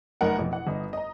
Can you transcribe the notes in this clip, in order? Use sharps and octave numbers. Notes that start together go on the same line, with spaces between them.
F1 F#2 D#4 A#4 F#5
A1 F2 B2
F#5
G1 D#5
D#5 A#5